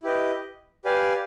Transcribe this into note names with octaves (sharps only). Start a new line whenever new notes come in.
E4 G4 B4 D#5
G4 B4 D5 F5 G#5